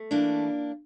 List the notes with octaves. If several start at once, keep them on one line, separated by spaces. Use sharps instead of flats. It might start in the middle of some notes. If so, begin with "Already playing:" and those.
Already playing: A3
E3 A#3 D4